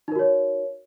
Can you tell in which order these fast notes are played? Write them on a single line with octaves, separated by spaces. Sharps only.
D#4 A#4 F#4 C#5